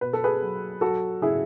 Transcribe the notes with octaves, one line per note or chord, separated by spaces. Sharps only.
B2 B4
A4
G#4 B4
F#3
F#3 F#4 A4
C#3 E4 G#4